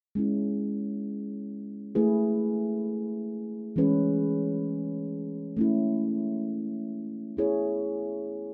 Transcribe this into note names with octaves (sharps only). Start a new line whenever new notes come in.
G#3 C#4 E4
A3 E4 G#4 B4
E3 G#3 C#4 G#4 B4
A3 C#4 E4
B3 E4 G#4 C#5